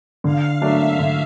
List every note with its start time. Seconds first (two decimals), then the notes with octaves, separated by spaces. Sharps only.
0.24 D3 F5
0.62 F#3 A3 D4 E5
0.99 D3